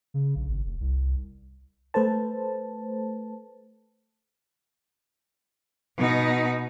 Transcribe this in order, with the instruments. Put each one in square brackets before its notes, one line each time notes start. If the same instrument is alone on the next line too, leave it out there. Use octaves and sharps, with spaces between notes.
[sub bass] C#3
A#1
G#1
F1
C2
[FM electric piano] A3 A4 B4 C5 A5
[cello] B2 D#4